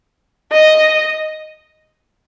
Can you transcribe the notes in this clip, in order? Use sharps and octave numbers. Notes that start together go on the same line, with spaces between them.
D#5